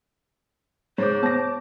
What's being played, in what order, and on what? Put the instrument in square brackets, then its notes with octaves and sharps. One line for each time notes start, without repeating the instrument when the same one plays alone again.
[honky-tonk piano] G#2 D6 [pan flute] C5 [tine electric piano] C#5
[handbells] B3 A#6 [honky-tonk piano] A5 D6